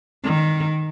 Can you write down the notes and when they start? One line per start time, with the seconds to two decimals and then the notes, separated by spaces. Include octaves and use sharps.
0.24 D#3